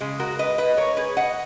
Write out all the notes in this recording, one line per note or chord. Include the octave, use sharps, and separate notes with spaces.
C#3 G#3
F#4 A#4
B4 D#5
B4 D#5
A#4 C#5
G#4 B4
D#5 F#5